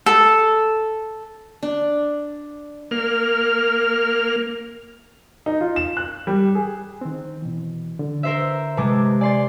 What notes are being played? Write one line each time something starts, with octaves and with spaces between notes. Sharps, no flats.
A4
D4
A#3 F6
D#4
F4
E7
F#6
G3
G#4
D#3 C4
B2 E3
D3
A#4 C5 E5
C3 G#3 B4 A5 D6
D5 G#5 C6 A6